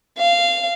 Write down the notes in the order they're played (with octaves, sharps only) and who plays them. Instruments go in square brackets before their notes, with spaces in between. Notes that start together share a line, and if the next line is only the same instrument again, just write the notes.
[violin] F5